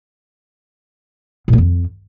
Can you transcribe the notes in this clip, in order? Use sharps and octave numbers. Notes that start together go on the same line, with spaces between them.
A#2
A#3
F2